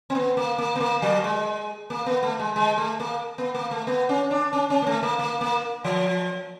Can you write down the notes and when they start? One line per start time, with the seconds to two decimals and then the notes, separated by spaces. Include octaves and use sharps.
0.10 C4
0.15 B3
0.37 A#3
0.58 A#3
0.76 B3
0.80 A#3
1.02 F#3
1.24 G#3
1.90 A#3
2.06 B3
2.23 A3
2.39 G#3
2.56 G#3
2.77 A3
3.00 A#3
3.38 B3
3.55 A#3
3.71 A3
3.87 B3
4.09 C#4
4.31 D4
4.53 C#4
4.70 C#4
4.82 A#3
4.87 A3
5.03 A#3
5.19 A#3
5.41 A#3
5.85 F3